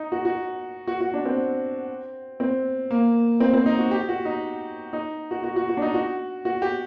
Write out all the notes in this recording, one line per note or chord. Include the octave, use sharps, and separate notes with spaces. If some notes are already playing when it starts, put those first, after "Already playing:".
Already playing: D#4
F#4
F#4
F#4
F#4
D4
C4
C4
A#3
C4
C4
D#4
F#4
G4
F#4
D#4
D#4
F#4
F#4
F#4
F#4
D4
D#4
F#4
F#4
G4